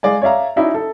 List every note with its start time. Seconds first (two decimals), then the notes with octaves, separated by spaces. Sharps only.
0.03 G#3 D5 F5 G#5
0.22 C#5 D5 E5 F5 A#5
0.56 C#4 D#4 E4 F#4 D5
0.74 A4